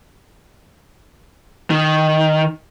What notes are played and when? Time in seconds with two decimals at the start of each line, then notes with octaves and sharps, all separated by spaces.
1.70 D#3